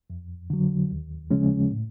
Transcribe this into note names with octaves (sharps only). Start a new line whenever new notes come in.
F2
D3 F#3
D#2
C#3 F3 G#3 C#4
A2